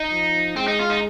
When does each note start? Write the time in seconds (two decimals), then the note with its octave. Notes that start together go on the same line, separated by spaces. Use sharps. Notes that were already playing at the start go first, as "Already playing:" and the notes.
Already playing: D#4
0.11 F3
0.56 G#3 C4
0.67 D#4
0.79 F4
0.90 D#4